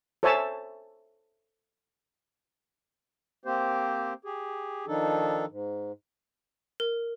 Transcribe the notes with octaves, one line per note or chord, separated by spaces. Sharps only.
A4 C5 C#5 E5 G#5 A5
A#3 C4 G4 C5
G4 G#4
D#3 F3 D4 D#4 A4
G#2
A#4